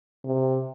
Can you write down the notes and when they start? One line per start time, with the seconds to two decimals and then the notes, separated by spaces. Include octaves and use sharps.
0.24 C3